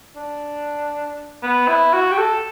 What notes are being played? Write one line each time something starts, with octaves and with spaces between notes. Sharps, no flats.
D4
B3
E4
F#4
G4
A4